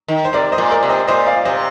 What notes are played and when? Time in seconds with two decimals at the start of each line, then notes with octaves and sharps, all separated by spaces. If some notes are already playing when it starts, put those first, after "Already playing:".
0.08 D#3
0.25 C5
0.33 C3 A#4 D5
0.52 C5 D#5
0.58 A#2
0.71 A#4 D5
0.83 C3
0.89 C5 D#5
1.07 A#2 C5 D#5
1.27 D5 F5
1.45 C3 C5 D#5